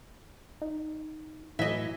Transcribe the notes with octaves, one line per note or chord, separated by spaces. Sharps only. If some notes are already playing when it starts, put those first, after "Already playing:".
D#4
A2 E3 F#3 E4 D#5 E5